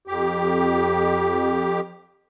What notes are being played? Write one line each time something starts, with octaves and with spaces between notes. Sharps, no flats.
F2 G4